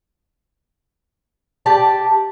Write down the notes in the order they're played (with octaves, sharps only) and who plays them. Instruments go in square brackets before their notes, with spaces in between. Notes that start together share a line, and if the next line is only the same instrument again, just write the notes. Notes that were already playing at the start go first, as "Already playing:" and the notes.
[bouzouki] G4 D5 A5